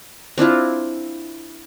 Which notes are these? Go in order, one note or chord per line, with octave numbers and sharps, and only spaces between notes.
C4 D4 E4 F4